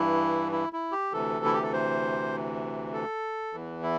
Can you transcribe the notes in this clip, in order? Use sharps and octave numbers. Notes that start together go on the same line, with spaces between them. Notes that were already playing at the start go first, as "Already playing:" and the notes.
Already playing: G2 E3 E4
E4
E4
G4
D2 C3 E3 A4
E4
G4
A4
C5
A4
E2 E3
E4